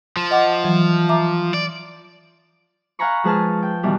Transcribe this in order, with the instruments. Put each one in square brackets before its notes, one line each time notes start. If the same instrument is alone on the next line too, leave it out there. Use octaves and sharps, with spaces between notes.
[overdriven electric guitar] F3
[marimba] D#5 F#5 D6
E3 F#3
E5 A#5 D6
[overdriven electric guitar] D5
[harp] F5 F#5 G#5 A#5 B5 C#6
F3 G#3 G#4 B4 A5 F6
G5
B2 D#3 E3 G3